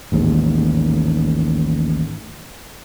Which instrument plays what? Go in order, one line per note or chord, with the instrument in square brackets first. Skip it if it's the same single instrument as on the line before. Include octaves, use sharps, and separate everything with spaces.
[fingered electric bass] A1 D#2 G#2